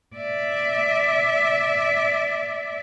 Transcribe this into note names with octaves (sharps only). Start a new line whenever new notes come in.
D5 E5